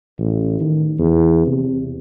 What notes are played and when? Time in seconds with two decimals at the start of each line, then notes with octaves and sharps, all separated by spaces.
0.19 A1
0.61 D#3
0.99 E2
1.47 C3